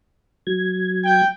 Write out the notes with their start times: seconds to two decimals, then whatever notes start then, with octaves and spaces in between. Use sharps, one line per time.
0.47 F#3 G#6
1.05 G5